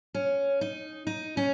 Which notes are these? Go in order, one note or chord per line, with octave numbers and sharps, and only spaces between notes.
C#4
D#4
D#4
C#4